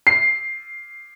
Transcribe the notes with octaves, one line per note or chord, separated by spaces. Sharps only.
C7